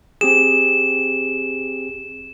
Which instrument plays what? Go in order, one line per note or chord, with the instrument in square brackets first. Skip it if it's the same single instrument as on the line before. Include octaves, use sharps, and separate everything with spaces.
[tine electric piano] C4 G4 G#4 [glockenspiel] E7